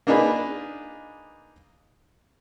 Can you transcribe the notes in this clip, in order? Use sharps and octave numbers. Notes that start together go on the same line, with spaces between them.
A#3 D4 D#4 F4 G#4 B4